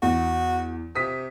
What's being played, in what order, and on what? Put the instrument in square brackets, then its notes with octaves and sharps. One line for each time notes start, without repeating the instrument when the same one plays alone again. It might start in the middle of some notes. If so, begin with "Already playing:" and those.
[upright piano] E2 [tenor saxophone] F#4
[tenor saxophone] C3 [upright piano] D#6 B6